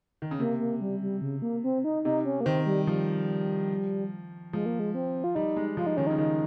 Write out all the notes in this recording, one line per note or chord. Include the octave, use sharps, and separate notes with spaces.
D#3
C#3
C3 A#3
A#3
G3
G3
C#3
A#3
C4
D#4
C3 D#4
C#4
A#3
D#3 C4
G3
F3 G3
F3 G#3
A#3
G#3
C4
F4
G3 D#4
G#3
F3 F4
D#4
D#3 C#4
D#4
C#3
D#3 D#4